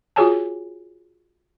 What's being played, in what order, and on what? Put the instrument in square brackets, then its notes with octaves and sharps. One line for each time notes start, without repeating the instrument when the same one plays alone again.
[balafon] F4 F#4 G#4 C#5 G#5 A5